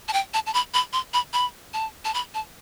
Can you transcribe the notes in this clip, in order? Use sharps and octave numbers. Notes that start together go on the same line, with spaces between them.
A5
G5
A5
A5
B5
B5
C6
B5
B5
A5
A5
B5
A5